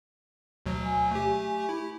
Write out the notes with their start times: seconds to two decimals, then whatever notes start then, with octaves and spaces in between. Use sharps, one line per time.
0.66 D2 B2 F#3
0.84 G#5
1.11 A3 G4
1.69 E4